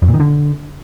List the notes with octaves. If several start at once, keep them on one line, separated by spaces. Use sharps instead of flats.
F2
A#2
D#3
D3